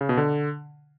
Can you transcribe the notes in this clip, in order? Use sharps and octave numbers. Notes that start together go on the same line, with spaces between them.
C#3
B2
D3